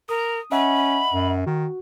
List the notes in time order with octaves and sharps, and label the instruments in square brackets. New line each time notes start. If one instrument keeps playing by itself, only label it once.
[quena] A#4 [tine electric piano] D#6
[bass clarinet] C#4 [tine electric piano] D#5 E5 F#5 [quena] B5
[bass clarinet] F#2
[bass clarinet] D#3 [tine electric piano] F#4